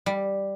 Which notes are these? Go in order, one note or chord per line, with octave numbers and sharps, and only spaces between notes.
G3